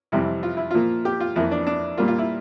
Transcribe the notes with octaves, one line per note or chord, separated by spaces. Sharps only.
F2 C3 E3 G3 E4
F4
E4
A#2 F3 A#3 F4
G4
F4
F2 E3 A#3 E4
D4
D4
A#2 G3 A#3 F4
F4
E4